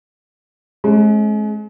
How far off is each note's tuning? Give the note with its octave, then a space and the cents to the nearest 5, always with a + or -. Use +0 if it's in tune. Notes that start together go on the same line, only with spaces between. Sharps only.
G#3 +40 C#4 -30